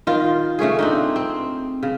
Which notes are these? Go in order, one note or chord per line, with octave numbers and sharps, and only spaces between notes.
D#3 F4
C#3 A3 C#4 G#4
C4 D4 D#4
C4
C#3